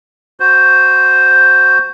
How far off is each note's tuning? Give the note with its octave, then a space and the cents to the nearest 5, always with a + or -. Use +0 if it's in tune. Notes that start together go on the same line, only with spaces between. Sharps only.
F#4 +0 C5 +0